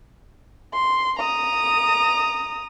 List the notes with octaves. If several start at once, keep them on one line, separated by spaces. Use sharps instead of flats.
C6
A#5 D#6